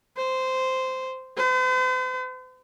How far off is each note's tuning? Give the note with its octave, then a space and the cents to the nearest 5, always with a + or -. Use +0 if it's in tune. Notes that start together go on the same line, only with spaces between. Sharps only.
C5 -10
C5 -45